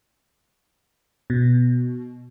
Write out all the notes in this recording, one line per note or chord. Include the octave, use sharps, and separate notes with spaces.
B2